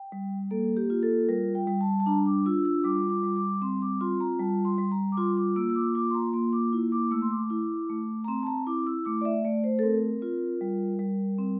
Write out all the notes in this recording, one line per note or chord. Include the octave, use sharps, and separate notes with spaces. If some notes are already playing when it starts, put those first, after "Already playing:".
Already playing: G5
G3
A#3 A4
G4
F4
A4
G3 A#4
G5
G3
A5
A5
D4 A#5
D6
F4 E6
E6
G3 D6
D6
G3
D6
C4 C6
D6
F4 C6
A#5
G3 A5
C6
G3
A#5
D6
F4 C6
D6
A#3 E6
E6
D6
F4 D6
C6
A#5
A#3 C6
D6
E4
D6
A3 E6
C6
D6
E4
A3
A#5
C4 C6
A5
A#5
E4 D6
E6
A3 D6
D5
E5
A3 D5
C5
A4
C4 A#4
F4
G3
G3
C4